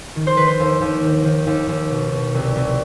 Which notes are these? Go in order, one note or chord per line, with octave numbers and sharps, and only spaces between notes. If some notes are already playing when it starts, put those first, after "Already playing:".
D#3
C5
D#3 B4
C5
D#2
D#2
D#3
D#3
D#2
D#2
B2
B2
C2
C2